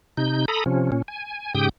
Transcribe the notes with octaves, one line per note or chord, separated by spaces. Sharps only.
C3 D#4 G6
A4 A#5 B5 D#6
C3 F3 C#4
A#2 C#4
G#5
G#2 C#3 G4 G5 D#6 G6